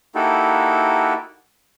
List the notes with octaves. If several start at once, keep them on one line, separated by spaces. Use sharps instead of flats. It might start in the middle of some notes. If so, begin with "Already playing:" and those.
A#3 D#4 E4 F#4 G4 A4